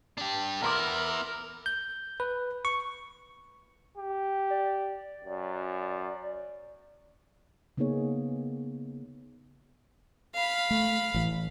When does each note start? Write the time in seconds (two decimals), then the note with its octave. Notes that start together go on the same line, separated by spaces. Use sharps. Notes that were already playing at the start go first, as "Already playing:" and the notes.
0.18 D4 G4
0.62 B3 E4 A#4 A#5 C6 D6
1.66 G6
2.20 B4
2.65 C#6
3.97 G4
4.50 D5
5.24 F#2
7.77 C#3 A#3 B3 D#4 G#4 C#5
10.35 F5 B5
10.71 A3
11.14 A1 E3